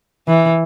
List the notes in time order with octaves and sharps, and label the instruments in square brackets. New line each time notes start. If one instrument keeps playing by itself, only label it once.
[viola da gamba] E3